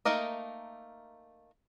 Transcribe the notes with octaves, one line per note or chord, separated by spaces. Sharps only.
A3 A#3 D#4 A#4 D#5